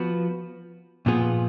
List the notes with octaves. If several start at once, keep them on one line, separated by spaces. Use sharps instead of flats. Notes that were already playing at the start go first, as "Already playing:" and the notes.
Already playing: F3 B3 F#4 B4
A#2 F3 B3 F4 G#4